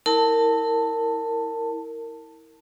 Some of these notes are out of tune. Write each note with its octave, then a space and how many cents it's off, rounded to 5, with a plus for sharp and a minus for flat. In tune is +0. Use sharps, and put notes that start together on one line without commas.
E4 -25 A#4 -20 A5 +10